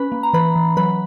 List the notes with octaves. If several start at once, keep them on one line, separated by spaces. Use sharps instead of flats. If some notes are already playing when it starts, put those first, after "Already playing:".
Already playing: C#4 B4 B5
A#3
A#5
E3 B4 B5
E3
F#3 B4 B5